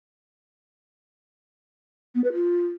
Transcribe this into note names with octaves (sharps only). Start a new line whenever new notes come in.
B3
B4
F4